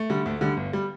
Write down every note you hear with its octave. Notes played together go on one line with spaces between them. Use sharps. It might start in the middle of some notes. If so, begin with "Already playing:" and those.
Already playing: A3
D3 G3
D2
D3 G3
G1
G3